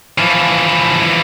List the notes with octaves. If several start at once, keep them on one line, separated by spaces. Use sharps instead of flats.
E3 F3